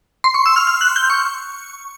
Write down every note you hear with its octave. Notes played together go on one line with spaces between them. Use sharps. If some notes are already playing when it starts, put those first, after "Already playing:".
C6
C#6
E6
F6
F6
F#6
G6
C#6